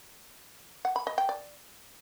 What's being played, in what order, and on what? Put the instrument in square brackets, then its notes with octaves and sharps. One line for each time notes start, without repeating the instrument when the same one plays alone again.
[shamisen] F#5
B5
D#5
G5
D5